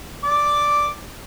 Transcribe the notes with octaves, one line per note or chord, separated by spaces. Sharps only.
D5 D6